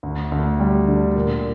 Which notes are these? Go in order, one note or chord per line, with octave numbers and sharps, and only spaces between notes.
D2
D2
G3
D3
A#2